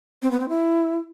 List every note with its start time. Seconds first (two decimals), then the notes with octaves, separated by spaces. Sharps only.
0.22 C4
0.31 B3
0.40 C4
0.49 E4